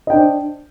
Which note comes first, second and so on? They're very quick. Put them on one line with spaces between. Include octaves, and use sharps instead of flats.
D#5 G5 D4 C5